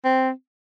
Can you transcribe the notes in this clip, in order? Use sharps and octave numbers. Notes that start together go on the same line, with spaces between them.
C4